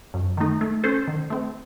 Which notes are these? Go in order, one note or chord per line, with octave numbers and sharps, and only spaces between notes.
F#2
D#3 A3 D#4
A3
C#4 A4 C5
D#3
A3 C4